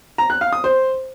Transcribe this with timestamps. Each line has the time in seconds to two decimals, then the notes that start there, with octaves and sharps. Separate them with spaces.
0.18 A#5
0.30 F#6
0.41 F5
0.53 D#6
0.64 C5